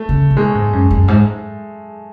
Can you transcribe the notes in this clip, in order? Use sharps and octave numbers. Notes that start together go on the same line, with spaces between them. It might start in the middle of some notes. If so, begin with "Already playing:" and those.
Already playing: A3
C#3
C#3
B2 G#3
G#2
F#2
F#2
G#2